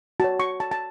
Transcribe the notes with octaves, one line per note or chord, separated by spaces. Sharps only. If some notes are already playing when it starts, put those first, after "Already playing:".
F#4 C#5 A5
C#6
A5
A5